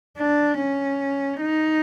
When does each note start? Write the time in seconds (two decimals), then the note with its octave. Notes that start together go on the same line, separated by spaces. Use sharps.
0.17 D4
0.59 C#4
1.41 D#4